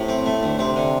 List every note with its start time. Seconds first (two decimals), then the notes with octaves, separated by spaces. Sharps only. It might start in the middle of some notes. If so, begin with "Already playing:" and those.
Already playing: A2 C3
0.08 C4
0.26 A3
0.43 D2
0.59 C3 C4
0.76 D3